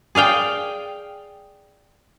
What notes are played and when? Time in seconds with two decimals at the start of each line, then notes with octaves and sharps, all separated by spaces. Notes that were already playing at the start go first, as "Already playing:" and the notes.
0.15 G#4 D5 F5 G5